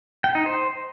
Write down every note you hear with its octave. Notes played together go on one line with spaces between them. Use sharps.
G5
D#4
C5